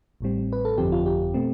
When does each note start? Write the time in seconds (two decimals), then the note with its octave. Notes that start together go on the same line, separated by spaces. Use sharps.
0.21 A1 A2 G3 C4
0.53 B4
0.65 A4
0.78 G1 F2 D3 F3 C4 G4
0.92 F4
1.06 G4
1.34 B2 A3 C4